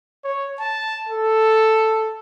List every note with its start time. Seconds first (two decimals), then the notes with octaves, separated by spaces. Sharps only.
0.25 C#5
0.59 A5
1.09 A4